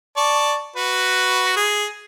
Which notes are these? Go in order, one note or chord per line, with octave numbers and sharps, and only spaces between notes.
D5 A5 C#6
F#4 B4
G#4